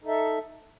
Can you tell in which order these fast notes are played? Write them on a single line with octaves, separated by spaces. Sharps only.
D#4 A4 E5